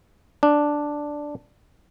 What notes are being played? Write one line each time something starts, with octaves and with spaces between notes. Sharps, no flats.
D4